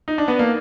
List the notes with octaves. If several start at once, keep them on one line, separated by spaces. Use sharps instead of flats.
D#4
D4
B3
A#3